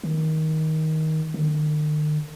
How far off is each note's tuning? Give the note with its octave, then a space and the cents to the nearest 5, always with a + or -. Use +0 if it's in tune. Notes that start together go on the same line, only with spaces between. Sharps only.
D#3 +15
D#3 -45